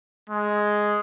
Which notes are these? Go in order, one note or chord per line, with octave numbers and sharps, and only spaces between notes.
G#3